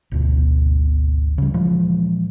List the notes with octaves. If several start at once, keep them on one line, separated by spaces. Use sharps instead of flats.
G#1 D2 B2
C#3 G3
A#2 E3 F3 G#3